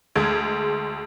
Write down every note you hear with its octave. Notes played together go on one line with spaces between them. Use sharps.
D2 G#3 G#6